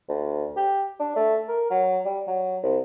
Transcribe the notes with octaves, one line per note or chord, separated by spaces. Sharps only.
D2
G4
D4
A3
A#4
F#3
G3
F#3
C2